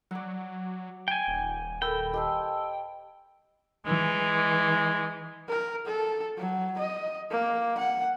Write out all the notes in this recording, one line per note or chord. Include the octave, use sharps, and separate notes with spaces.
F#3 D5 F#5
G5 G#5
D#1
A4 A#4 G5 B5 E6
G4 C5 D#5 G#5 A5 E6
E3 G#3
A#4
A4
F#3
D#5
A#3
F#5